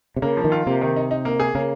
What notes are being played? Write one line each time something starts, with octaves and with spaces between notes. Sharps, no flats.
C3
C#3 A#3
F3
D#3
F4
C3 A#3
D#3
D#4
D#4
A#3
G#4
C#3 A#3